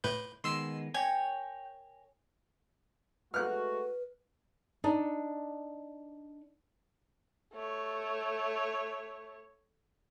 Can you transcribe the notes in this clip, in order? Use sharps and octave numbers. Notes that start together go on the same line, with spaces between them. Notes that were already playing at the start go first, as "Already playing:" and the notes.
A2 B4 G6
D#3 G#3 B3 C6 E6 C7
A#4 C#5 G5 G#5 G#6
G#3 A3 F#4 B4 F6 F#6
D4 D#4
A3 C#5